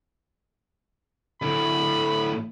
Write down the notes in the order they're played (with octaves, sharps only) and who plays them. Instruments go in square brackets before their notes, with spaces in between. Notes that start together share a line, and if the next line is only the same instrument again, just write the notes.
[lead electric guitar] D2 A2 [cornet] B5